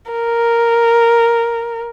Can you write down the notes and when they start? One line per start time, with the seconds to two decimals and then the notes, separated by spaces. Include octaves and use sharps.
0.12 A#4